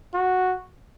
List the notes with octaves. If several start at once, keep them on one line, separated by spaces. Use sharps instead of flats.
F#4